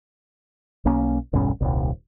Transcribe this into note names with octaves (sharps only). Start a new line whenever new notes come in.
B1 A#3 C#4
E1 B1 G2 C#4
D#1 C2